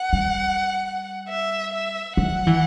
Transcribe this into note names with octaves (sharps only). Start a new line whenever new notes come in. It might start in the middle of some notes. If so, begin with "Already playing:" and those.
Already playing: F#5
G3
E5
E5
F#3 F#5
E3